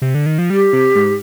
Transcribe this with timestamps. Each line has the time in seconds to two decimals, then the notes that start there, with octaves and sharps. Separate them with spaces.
0.02 C3
0.15 D3
0.26 D#3
0.38 F3
0.50 G3 G4
0.73 C3
0.95 G#2